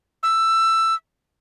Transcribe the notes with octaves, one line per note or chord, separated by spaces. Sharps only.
E6